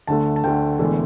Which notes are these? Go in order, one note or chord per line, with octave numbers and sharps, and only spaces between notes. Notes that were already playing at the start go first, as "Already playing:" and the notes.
D2 D3 A3 A5
A5
D2 D3 A3 G5
E1 E2 D3 A3